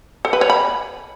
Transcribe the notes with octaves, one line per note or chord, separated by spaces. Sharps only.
A4
B4
C#5
B5